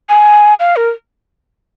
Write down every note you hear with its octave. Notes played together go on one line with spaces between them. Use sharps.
G#5
F5
A#4